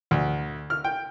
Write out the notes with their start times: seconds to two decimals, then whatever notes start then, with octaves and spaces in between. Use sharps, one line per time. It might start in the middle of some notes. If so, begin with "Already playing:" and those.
0.11 D2
0.70 F6
0.84 G5